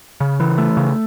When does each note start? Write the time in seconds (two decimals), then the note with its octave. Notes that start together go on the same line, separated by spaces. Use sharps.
0.20 C#3
0.40 E3
0.58 A3
0.77 C#3